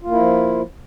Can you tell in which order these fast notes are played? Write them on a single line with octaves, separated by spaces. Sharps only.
F4 A#3 E4 F3